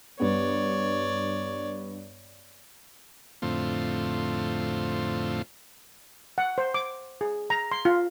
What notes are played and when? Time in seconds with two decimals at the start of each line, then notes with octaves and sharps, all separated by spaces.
0.20 G2 B3 C#5 D5
3.42 F2 A2 D3 A3 C4 F4
6.38 F#5
6.58 C5
6.74 D6
7.21 G#4
7.50 A#5
7.72 C6
7.85 F4